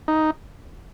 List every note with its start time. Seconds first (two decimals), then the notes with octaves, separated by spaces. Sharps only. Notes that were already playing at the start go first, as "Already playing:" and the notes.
0.08 D#4